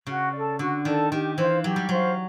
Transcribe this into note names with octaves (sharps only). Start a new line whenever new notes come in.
C#3 F#4
A4 D5
D3 F#4
D#3 A4 D5
D#3 G4
E3 C5 F5
F#3 G4
G3
F#3 C5 F5